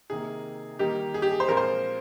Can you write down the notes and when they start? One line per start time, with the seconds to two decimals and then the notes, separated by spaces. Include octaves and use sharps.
0.10 C3 D#3 A#3 G#4
0.79 D#3 G3 A#3 D#4 G4
1.14 G#4
1.22 G4
1.31 G#4
1.40 C5
1.48 A#2 F3 G#3 C4 F4 A#4
1.57 C5